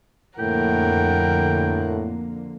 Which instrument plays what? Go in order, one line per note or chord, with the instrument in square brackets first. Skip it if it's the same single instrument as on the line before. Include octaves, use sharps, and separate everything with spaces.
[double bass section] F2 D3 A#3 [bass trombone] A2 [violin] A#4 F#5 [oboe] G5